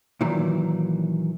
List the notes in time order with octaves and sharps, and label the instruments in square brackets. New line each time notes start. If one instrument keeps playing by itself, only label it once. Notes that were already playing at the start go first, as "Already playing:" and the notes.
[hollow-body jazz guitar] A#2 D#3 E3 F#3